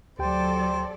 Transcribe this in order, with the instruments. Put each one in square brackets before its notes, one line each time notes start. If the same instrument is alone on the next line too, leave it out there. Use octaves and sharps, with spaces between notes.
[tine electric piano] D2 G4 G5 [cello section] F#3 A4 D5 [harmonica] C5